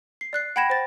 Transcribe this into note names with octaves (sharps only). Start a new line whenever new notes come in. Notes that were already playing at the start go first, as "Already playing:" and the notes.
C7
D5 F#6 C7
F#5 G5 B5 G#6 A#6 E7
C5 A6